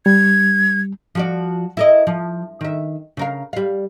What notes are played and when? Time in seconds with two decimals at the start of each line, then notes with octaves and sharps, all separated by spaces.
0.06 G3 G#6
1.15 F3 F#4 D5
1.77 E4 A#4 D#5
2.07 F3
2.61 D#3 E5
3.17 C#3 A#4 F5
3.53 G3 F5